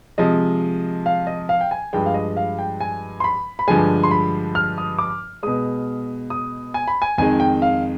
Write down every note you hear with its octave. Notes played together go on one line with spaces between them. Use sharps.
C3 F3 G#3 D#5
F5
D#5
F5
G5
G#5
G2 F3 G#3 G5
F5
D#5
F5
G5
G#5
C6
B5
B5
G2 D3 F3 G#3 G#5
C6
B5
F6
D#6
D6
B2 G#3 D#6
D#6
G#5
B5
G#5
F2 D#3 G#3 G#5
G5
F5